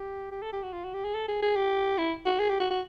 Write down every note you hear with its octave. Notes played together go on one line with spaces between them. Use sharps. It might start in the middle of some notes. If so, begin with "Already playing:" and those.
Already playing: G4
G4
A4
G4
F#4
F4
F#4
G4
G#4
A4
G#4
G#4
G4
E4
F#4
G#4
G4
F#4
F#4